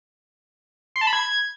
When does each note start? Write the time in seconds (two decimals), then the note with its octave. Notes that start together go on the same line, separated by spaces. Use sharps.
0.96 C6
1.01 A5
1.07 B5
1.13 G#6